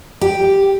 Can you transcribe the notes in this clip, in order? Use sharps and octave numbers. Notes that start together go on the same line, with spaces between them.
G4